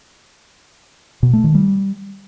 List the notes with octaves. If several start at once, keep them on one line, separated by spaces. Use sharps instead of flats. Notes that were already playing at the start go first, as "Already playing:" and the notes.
B2
A3
D#3
G3